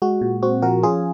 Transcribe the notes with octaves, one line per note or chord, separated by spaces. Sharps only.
G#3 F#4
A#2
C4 F#4
F3 F#4 A#4
C#4 F4 G#4